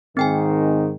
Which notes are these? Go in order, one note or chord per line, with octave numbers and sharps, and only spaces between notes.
G#2 D#3 C4 G5 G#5